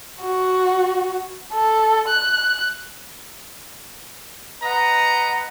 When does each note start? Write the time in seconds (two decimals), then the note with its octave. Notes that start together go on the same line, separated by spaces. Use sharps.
0.23 F#4
1.53 A4
2.08 F#6
4.63 B4 D#5 F#5 A#5